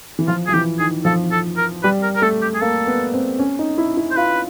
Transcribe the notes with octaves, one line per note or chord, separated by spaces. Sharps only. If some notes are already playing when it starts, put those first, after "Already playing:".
E3
F3 F4
F3 G#4
E3 G4
D#3 G#4
F3 A4
A4
A#4
G3 B4
A#4
A#4
A3 A4
G4
G#4
A#3 A4
B3
C4
C#4
D#4
E4
E4
C5
F4 B4